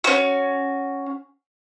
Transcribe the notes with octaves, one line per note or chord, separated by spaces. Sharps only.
C#4 F#4